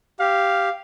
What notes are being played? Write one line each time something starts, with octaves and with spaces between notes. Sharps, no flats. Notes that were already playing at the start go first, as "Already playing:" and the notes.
G4 F5